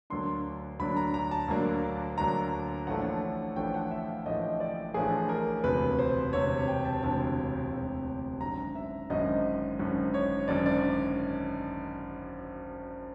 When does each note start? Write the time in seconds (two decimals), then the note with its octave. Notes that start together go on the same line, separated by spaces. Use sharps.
0.10 D2 D3 F#3 A#3 D4 C6
0.80 D2 D3 F#3 A#3 D4 B5
0.97 A#5
1.14 A#5
1.31 A5
1.48 D2 D3 F#3 A#3 D4
2.18 D2 D3 F#3 A#3 D4 A#5
2.87 A1 A2 F3 A3 D4 F#5
3.56 A1 A2 F3 A3 D4 G5
3.74 F#5
3.91 E5
4.08 F5
4.26 A1 A2 F3 A3 D4 D#5
4.60 D5
4.94 A1 A2 F3 A3 D4 G#4
5.29 A#4
5.64 E1 D2 C3 B4
5.99 C5
6.33 E1 D2 C3 C#5
6.68 G5
6.85 A5
7.02 E1 D2 C3 A5
7.72 E1 D2 C3
8.41 G#1 F#2 D3 A#5
8.75 E5
9.10 G#1 F#2 D3 D#5
9.79 G#1 F#2 D3
10.14 C#5
10.48 G#1 F#2 D3 D5
10.66 D5